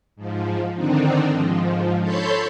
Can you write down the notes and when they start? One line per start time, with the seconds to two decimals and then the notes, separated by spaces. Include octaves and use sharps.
0.16 G#2 F3
0.74 D3 D#3 C4 D4 D#4
1.30 G#2 F3
2.01 A4 C#5 A5 B5 C6 G6